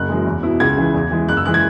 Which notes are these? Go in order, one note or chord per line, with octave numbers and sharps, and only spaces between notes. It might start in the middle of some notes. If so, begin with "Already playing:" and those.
Already playing: F#1 F#6
F#2 E3 G#3
E2
B2 B3 E4
C#2 G#6
C#3 E3
E2
E3 G#3
F#1 F#6
E6
E3 G#3 F#6
G#6